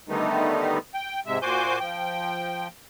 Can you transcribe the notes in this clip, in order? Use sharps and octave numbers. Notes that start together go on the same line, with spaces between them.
D3 D#3 G3 A3 B3 D#4
G5
G#2 C3 G#3 E5
A#2 F#4 C5 G#5 D6 G6
F3 G5